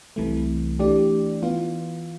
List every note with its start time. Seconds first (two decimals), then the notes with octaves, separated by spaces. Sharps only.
0.16 C2 C3 E3 A3
0.79 E3 A3 D4 G4 D5
1.42 E3 B3 F4